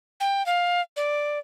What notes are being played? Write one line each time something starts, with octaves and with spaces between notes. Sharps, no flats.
G5
F5
D5